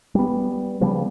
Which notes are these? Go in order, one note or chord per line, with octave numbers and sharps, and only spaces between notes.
G3 B3
C#3 F3 G3 B3